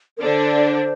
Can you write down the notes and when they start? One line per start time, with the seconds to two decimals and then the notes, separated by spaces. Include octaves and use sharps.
0.17 A#4
0.23 D3 D4 C5